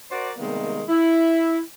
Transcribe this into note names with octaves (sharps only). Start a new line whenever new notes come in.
F#4 A#4 C5 D5
C3 D#3 G3 G#3 A#3 B3
E4